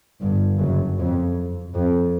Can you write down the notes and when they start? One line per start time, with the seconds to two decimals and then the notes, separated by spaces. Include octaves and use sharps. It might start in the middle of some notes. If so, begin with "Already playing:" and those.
0.21 G1 G2
0.60 F#1 F#2
0.98 F2
1.74 F2